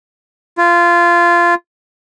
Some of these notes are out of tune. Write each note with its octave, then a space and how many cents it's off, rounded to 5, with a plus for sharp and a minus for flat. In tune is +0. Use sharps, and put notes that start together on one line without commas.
F4 -15